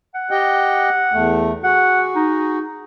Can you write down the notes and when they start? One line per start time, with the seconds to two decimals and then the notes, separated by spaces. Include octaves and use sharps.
0.15 F#5
0.31 G4 D#5 G5
1.12 E2 A3
1.64 F#4 G#4 F#5
2.16 D#4